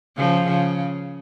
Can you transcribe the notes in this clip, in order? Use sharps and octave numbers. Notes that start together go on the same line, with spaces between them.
C#3 F3
C#3